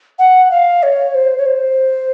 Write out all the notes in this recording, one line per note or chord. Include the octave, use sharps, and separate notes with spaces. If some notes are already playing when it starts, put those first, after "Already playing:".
F#5
F5
C#5
C5
C#5
C5